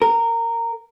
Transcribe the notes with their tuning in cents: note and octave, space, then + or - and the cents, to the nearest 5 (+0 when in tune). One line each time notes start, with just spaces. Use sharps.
A#4 -15